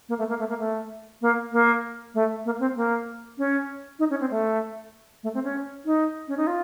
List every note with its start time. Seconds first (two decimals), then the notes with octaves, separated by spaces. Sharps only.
0.09 A#3
0.18 A3
0.29 A#3
0.39 A3
0.49 A#3
0.59 A3
1.22 A#3
1.53 A#3
2.14 A3
2.45 A#3
2.60 C4
2.76 A#3
3.38 C#4
3.99 D#4
4.10 C#4
4.21 C4
4.31 A3
5.23 A3
5.34 C4
5.44 C#4
5.85 D#4
6.28 C#4
6.37 D#4
6.47 F4